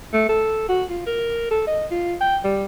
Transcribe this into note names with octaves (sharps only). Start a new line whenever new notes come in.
A3
A4
F#4
F4
A#4
A4
D#5
F4
G5
G3